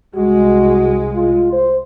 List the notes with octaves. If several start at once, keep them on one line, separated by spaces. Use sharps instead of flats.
C2 G#3 F#4
F4
C5